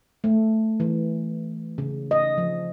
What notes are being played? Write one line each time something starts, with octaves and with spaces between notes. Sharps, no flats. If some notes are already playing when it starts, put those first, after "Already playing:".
A3
E3
C#3
D#5
F3